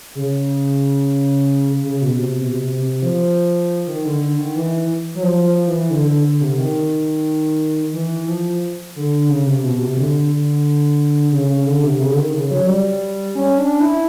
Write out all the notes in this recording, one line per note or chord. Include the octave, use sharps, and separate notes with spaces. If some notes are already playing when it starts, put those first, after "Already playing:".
C#3
C#3
B2
C3
B2
C3
C3
C3
F3
D#3
D3
D3
D#3
E3
F#3
F3
F3
E3
D3
D3
D3
C3
D#3
E3
F3
D3
C#3
C3
B2
C3
D3
D3
C#3
C#3
D3
C3
C#3
D3
D#3
C#3
F#3
G3
C#4
D4
E4